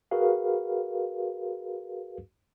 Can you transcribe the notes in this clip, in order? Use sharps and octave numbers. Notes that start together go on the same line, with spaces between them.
F#4 G#4 A#4 B4 F5